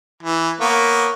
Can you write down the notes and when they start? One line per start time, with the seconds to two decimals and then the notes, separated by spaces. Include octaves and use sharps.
0.23 E3
0.61 A#3 B3 C#5